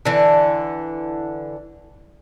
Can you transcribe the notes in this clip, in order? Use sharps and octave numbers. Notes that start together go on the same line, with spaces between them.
D3 E3